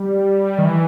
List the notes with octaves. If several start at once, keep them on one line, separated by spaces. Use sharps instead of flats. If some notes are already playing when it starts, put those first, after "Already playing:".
Already playing: G3
D#3
E3